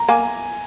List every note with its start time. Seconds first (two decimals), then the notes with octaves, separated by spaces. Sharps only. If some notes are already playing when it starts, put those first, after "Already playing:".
Already playing: A#5
0.08 A#3 G#5